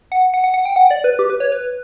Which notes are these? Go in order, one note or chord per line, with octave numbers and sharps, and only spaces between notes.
F#5
F#5
F#5
F#5
G5
F#5
D5
B4
G4
B4
C#5
B4